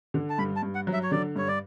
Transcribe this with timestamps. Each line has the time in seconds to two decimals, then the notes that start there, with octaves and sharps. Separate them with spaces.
0.14 D3
0.30 A5
0.38 G2 B5
0.56 A5
0.63 G2
0.75 F#5
0.87 F#3
0.93 E5
1.03 C#5
1.11 D3 D5
1.36 G2 C#5
1.48 D5